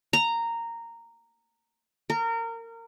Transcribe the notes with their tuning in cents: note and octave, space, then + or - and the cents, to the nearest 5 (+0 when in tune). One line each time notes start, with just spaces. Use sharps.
A#5 -10
A#4 -25